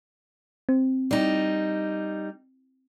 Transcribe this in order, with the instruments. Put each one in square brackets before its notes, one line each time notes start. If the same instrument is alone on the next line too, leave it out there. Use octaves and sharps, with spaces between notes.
[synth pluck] C4
[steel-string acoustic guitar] G3 D#4